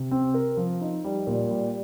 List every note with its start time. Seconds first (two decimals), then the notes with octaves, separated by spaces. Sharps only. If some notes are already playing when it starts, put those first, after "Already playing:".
Already playing: C3
0.11 C4
0.34 A#4
0.57 F3
0.81 D#4
1.04 G3
1.27 A#2
1.51 G3